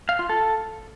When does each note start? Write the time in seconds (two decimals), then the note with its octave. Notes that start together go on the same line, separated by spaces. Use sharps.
0.09 F5
0.19 F4
0.29 A4